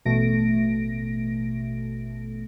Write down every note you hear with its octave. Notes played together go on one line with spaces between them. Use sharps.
A1 B2 A3 A#6 D7